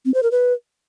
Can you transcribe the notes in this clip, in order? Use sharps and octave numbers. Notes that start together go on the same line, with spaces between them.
C4
C5
A#4
B4